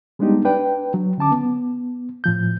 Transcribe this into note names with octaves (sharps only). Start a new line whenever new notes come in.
G3 G#3 B3 D4 D#4 G4
D4 B4 G5
F#3
D3 C#4 A5 D6
B3
A2 F3 G6